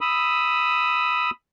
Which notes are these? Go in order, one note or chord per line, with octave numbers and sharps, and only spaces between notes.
B5 D#6 E6